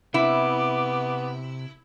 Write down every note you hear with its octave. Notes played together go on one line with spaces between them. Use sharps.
C3 B3 E4 D6